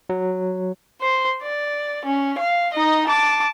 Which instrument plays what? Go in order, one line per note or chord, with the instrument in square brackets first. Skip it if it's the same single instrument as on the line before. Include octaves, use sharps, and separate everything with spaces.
[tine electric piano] F#3
[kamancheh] C5
D5
C#4
F5
D#4 D#5
A5 D6